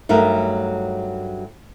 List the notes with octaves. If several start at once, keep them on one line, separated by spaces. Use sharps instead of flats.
G2 F#3 A3 D#4 A#4